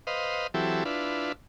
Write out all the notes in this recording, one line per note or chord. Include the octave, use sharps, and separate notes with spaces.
B4 C5 D#5 F5
E3 F#3 C4 E4 G4 A4
D4 E4 F4 B4